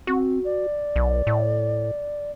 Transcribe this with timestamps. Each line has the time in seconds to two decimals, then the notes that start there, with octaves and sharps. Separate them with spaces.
0.07 C4 F#4
0.45 D5
0.96 B1
1.27 A2